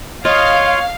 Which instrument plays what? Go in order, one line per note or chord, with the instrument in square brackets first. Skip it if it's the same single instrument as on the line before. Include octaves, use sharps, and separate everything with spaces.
[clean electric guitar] F4 [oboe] C#5 [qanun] D#5 [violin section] F5